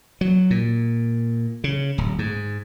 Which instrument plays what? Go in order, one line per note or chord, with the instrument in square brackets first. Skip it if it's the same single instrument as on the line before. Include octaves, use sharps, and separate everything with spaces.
[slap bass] F#3
A#2
C#3
D1
G#2